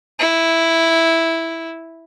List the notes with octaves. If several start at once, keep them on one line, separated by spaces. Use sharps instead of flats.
E4